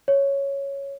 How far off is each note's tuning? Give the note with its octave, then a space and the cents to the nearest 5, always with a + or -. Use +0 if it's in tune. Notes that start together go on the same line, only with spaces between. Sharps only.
C#5 +0